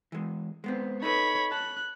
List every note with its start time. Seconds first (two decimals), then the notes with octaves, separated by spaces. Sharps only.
0.12 E3 G#3
0.64 G#3 B3 C4
1.02 D#4 A4 B4 C#5 B5
1.52 A5 F#6